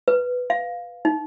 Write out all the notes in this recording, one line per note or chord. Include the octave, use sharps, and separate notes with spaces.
B4
F5
D#4